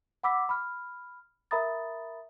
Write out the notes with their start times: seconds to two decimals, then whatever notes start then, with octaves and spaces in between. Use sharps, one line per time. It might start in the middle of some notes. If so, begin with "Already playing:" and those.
0.23 F#5 B5 D6 E6 B6
0.49 B5 F6
1.51 A#4 E5 A#5 B5 D#6 A6